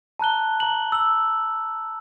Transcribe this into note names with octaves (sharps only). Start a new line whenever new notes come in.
A5 A#5 F#6 G7
A#5 F#7
E6 F#7